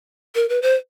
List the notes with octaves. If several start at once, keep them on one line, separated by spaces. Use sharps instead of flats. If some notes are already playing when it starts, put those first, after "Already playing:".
A#4
B4
C5